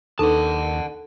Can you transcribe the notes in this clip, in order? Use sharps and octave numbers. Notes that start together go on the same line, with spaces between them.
D#2 D4 D#4 A4 B4 F#5 A5